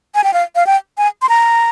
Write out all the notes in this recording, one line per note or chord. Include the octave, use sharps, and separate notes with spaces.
G#5
G5
F5
F5
G5
G#5
C6
A#5